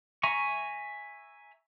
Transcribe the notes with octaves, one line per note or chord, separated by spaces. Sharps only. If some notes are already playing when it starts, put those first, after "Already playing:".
E5 G#5 A#5 C#6